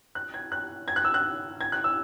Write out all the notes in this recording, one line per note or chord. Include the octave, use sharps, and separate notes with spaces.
F#6
G#6
F#6
G#6
F#6
E6
F#6
G#6
F#6
E6